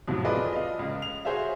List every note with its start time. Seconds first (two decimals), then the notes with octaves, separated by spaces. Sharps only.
0.08 F2 A2 C3 F3 F#3
0.25 F4 G#4 A4 B4 D5 D#5
0.53 D#5 F5
0.79 C#2
1.02 F7
1.25 F#4 G#4 C5 C#5 E5 F5